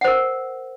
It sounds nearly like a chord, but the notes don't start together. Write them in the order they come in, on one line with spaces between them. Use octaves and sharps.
F#5 C5 A#4